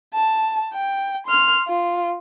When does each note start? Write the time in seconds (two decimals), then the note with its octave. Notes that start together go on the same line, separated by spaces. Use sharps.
0.14 A5
0.74 G5
1.27 C6 F6
1.68 F4